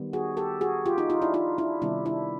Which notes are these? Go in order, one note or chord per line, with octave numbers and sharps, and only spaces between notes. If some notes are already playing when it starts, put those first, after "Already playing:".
Already playing: D#3 G3 B3
F#4 G#4
G4 A4
F#4 G#4
F4 G4
D#4 F4
D#4 F4
D4 E4
D#4 F4
D4 E4
C3 D#3 G3 B3 D4 E4
D4 E4